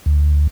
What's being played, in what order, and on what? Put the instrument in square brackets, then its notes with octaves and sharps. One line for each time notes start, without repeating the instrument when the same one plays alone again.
[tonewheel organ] D2